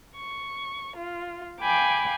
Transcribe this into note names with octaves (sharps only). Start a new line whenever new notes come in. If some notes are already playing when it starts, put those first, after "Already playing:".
C#6
F4
F5 G5 G#5 B5 D6